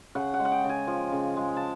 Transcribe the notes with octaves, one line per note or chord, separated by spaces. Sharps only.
C#3 F#5
F#5
G#3
F#5
G5
C#3
G#5
F3
C#3
G#3
A5